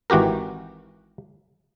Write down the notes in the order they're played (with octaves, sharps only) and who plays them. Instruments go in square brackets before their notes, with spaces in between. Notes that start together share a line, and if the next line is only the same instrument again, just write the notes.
[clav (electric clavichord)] G#1 E3 F#4 G4 A#4